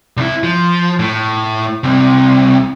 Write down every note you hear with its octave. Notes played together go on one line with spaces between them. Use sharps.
C2 E4
F3
A2
C2 C3